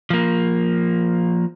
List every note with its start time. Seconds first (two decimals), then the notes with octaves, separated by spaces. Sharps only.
0.10 F3 A#3